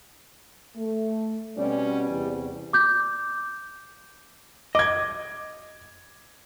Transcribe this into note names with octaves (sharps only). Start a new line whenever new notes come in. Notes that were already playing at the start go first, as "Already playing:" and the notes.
A3
B2 G3 C4 C#4
E2 C3
D6 G6
D#5 D6 G#6